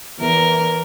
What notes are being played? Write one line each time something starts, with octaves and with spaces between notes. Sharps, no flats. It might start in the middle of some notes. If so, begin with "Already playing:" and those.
E2 A#4